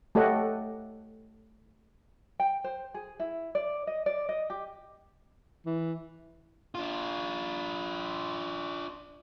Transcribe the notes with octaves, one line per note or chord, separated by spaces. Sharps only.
A3 G4 A4 C#5 D#5 F#5
G5
C5
G#4
E4
D5
D#5
D5
D#5
G4
E3
D4 F4